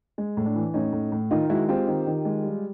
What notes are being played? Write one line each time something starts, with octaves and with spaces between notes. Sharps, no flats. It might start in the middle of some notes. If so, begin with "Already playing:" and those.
G#3
A2
D4
E3
A2 C#4 D#4
A2
A2
D#3 D#4 F4
G#3 E4 F#4
C4 F4 G4
D#3
D#3
G#3
G3